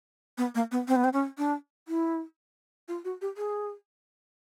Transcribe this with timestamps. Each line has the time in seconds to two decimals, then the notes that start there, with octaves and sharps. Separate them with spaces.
0.38 B3
0.55 A#3
0.72 B3
0.88 C4
0.96 B3
1.04 C4
1.13 C#4
1.38 D4
1.88 E4
2.88 F4
3.05 F#4
3.22 G4
3.37 G#4